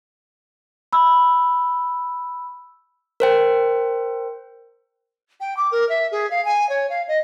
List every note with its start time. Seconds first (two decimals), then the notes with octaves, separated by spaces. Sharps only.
0.93 B5 E6
3.20 A#4 C5 G5
5.40 G5
5.56 D6
5.71 A#4
5.89 E5
6.11 G#4
6.30 F5
6.44 G#5
6.69 C#5
6.89 F5
7.08 D#5